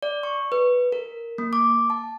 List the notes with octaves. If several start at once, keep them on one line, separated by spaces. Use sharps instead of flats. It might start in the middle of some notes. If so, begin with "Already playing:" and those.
D5
C#6
B4
A#4
A#3
D6
A5